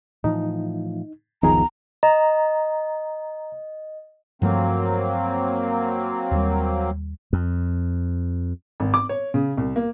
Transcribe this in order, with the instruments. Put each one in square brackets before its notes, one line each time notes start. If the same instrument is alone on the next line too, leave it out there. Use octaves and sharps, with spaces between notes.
[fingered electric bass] A2 E3 F3 [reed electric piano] D#4
[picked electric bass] F#1 D#3 F3 [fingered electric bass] C#2 B3 [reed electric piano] D#4 G#4 [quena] A#5
[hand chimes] D#5 [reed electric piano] A#5
[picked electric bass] G2 F3 A3 [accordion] F#3 A#3 C4
[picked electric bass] D#2 G3
[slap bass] F2
[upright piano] G#1
D6
C#5
C#3
C2
A#3